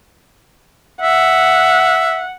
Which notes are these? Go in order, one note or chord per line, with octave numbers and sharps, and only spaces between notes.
E5 F#5